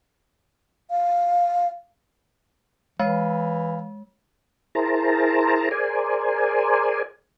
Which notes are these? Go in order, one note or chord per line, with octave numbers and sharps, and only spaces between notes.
F5
E3 G#3 F5
E4 G#4 A#4 C5 A5 A#5
G#4 A#4 C5 D5 G#5